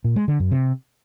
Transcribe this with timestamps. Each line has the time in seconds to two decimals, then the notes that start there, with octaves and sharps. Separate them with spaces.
0.04 A#2
0.16 G#3
0.28 D3
0.40 F#2
0.51 C3